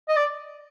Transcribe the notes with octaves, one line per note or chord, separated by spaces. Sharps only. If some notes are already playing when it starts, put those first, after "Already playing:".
D#5
D5